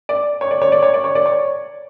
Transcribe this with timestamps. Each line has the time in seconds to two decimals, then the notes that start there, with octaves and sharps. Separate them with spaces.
0.09 D5
0.41 C#5
0.51 D5
0.62 C#5
0.72 D5
0.83 C#5
0.94 D5
1.04 C#5
1.15 D5
1.26 C#5